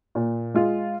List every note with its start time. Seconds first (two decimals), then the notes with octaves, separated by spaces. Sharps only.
0.15 A#2
0.54 G#3 F4